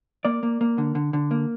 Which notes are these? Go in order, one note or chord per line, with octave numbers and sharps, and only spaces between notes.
A#3 D5
A#3
A#3
D3
D3
D3
A#3